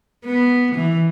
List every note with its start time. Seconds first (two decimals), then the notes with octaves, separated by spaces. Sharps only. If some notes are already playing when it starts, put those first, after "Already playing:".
0.25 B3
0.76 E3